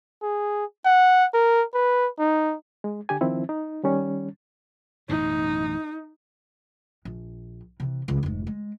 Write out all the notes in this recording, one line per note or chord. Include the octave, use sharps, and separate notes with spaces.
G#4
F#5
A#4
B4
D#4
G#3
D3 G4 G#5
D#3 F3 C4 E4
D#4
D#3 G3 C#4
A1 F#2 B2 D#4
A#1
C3 E3
C#2 C#3
F1 G#2
G#3